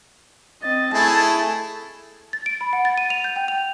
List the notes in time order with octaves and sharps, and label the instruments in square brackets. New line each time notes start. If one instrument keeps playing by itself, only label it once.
[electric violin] C4 D#5 [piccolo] A6
[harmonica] A3 E4 G#4 [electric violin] A5
[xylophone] A6
D7
B5
F#5
A6
D#7
F7
G6
G5
F7